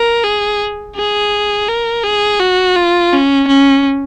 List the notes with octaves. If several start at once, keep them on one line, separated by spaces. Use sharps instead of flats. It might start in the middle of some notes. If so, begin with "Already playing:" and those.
Already playing: A#4
G#4
G#4
A#4
G#4
F#4
F4
C#4
C#4